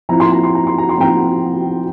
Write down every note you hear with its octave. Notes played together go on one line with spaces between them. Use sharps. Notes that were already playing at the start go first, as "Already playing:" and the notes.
F3 C4 E4 A#5
C6
A#5
C6
A#5
C6
A#5
C6
F3 C4 E4 G5 A#5